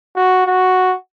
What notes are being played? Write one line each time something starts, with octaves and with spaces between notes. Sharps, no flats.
F#4
F#4